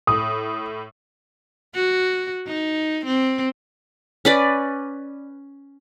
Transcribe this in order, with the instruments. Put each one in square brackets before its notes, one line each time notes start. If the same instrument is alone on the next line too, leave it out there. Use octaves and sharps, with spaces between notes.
[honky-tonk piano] A2 [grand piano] D#6
[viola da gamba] F#4
D#4
C4
[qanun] C#4 B4 D5